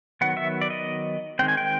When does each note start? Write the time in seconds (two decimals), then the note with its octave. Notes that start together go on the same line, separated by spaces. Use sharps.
0.21 D#3 F#3 B3 F#5
0.37 E5
0.61 D5
0.70 D#5
1.39 D#3 G#3 C4 G5
1.48 G#5
1.57 G5